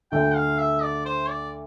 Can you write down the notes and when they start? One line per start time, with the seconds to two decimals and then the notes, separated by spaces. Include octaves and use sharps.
0.12 D2 D3 A3 G5
0.35 F5
0.59 E5
0.83 D5
1.05 C5
1.30 D5